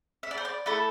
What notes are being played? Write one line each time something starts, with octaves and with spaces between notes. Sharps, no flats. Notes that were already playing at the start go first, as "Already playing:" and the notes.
E5
D5
C5
D5
A3 E4 A4